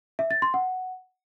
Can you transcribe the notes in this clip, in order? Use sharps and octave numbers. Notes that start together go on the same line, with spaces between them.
E5
A6
C6
F#5